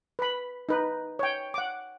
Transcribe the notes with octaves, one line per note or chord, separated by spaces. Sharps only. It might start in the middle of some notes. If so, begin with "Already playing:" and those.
B4 B5
D#4 B4
C#5 G5
F#5 D6